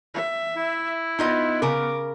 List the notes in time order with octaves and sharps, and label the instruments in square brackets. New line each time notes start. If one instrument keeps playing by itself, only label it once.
[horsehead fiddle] E5
[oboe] E4
[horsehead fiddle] B3 [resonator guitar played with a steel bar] D#4 F4 D#5
[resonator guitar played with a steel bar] C#3 A#4 [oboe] D6